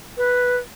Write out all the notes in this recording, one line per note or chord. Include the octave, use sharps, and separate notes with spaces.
B4